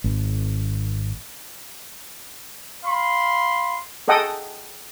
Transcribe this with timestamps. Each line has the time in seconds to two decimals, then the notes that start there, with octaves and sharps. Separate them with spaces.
0.04 G#1
2.85 F5 B5 C6
4.08 G#4 A4 D#5 F#5 G5 D#6